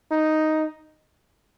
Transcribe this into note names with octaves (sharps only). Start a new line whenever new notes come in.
D#4